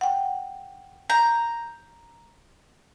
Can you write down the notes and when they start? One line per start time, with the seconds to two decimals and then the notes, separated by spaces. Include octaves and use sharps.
0.01 F#5 G5
1.10 A#5 G6